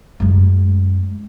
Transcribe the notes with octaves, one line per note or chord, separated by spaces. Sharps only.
F#2 G#3